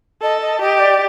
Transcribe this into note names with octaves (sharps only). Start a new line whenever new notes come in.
A4 D#5
D#5
G4 D#5
D5